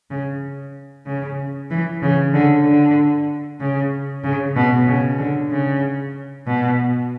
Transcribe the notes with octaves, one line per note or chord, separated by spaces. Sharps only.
C#3
C#3
E3
C#3
D3
D3
C#3
C#3
B2
C#3
D3
C#3
B2